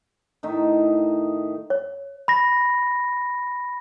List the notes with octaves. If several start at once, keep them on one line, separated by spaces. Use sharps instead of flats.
A2 D#3 D#4 E5
C#5
B5 A#6